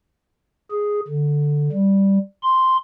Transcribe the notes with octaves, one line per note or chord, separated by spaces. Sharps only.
G#4
D3
G3
C6